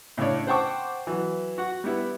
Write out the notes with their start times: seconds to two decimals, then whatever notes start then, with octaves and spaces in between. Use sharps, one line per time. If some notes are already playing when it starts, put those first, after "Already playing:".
0.17 A2 C#3 D4 C#5 D5
0.47 C5 F#5 G5 A5 C#6 D6
1.07 E3 F#3
1.58 F#4 F#5
1.84 G3 B3 E4